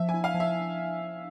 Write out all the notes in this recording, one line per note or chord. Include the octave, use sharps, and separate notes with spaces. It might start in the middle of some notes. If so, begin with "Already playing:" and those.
Already playing: F3 E5
G#5
E4
F5
F3
E5